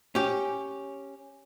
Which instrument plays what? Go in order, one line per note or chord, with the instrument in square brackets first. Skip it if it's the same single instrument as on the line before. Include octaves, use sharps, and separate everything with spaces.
[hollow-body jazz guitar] C#4 G4